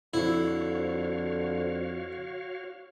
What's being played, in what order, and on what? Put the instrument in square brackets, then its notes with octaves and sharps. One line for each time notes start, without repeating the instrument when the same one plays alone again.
[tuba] F2 [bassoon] D3 [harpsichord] E4 [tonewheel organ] F#4 C#5 F5